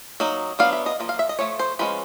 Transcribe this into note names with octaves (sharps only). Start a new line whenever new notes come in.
F#3 A#3 D#4
F#3 B3 D4 F5
E5
D#5
F3 A#3
F5
E5
D#5
F3 A3 C#5
C5
F3 G#3 C#4 B4